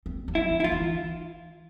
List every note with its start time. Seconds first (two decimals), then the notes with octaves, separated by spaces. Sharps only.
0.06 C4
0.28 F#3
0.35 E4
0.50 F3
0.60 E4
0.64 F4
0.72 E3